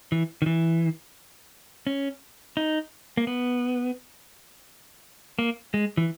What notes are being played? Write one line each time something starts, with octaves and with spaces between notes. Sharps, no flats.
E3
D#3
E3
C#4
D#4
A#3
B3
A#3
G#3
E3